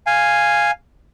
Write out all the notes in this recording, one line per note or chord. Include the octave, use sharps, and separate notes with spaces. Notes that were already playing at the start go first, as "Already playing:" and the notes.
F5 G#5